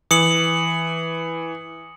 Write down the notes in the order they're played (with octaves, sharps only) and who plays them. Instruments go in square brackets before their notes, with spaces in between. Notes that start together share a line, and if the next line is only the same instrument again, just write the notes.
[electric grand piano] E3 [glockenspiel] D#6 C#7 F#7